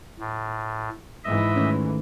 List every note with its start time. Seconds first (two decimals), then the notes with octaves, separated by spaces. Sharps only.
0.19 A2
1.24 G#2 E3 D#5 E5
1.56 D#3 A3 C#4